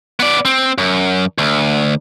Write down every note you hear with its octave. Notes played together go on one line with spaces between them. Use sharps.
B3 D5
C4
F#2
D2